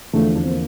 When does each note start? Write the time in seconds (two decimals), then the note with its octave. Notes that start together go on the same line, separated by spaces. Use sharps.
0.13 E2 D3 F3 A3
0.36 D4
0.43 C4
0.50 A#3